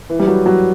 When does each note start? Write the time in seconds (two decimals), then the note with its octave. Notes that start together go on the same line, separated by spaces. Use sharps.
0.10 E3
0.20 G3
0.27 F#3
0.46 F#3